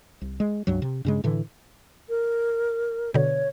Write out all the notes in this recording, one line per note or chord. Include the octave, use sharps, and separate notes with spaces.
C2
G#3
C#2 G2 F#3
C3
G2 C#3 G#3
A2 D3 E3
A#4
B2 D3 C#5